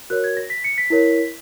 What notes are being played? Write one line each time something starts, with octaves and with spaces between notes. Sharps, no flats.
F#4 A#4 C#5 F#6
G#6
A#6
B6
C#7
B6
E4 A#4 C#5